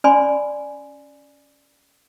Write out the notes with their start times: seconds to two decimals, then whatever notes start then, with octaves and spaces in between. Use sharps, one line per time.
0.04 C#4 D5 G#5 B5 C6